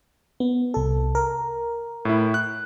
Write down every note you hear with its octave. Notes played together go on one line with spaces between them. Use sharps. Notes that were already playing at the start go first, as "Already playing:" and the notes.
B3
C2 A4
A#4
A2 E4
F#6